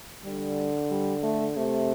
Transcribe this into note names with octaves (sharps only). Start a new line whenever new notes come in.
D3 G3
G3
A3
C3 A3